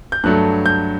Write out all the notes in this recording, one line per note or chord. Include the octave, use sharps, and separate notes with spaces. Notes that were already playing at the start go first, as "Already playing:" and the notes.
G6
G2 F#3 A3 F#6
G6